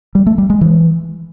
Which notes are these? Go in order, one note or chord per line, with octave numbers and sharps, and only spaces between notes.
G3
A3
G3
G#3
E3